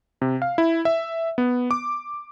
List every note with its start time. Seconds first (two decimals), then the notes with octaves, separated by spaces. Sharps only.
0.22 C3
0.42 F5
0.58 E4
0.85 E5
1.38 B3
1.71 D6